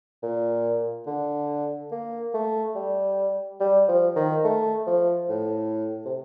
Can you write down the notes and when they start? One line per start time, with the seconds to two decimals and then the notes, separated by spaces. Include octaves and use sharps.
0.23 A#2
1.07 D3
1.92 A#3
2.34 A3
2.75 G3
3.60 G3
3.88 F3
4.16 D#3
4.44 A3
4.87 F3
5.29 A2
6.05 C3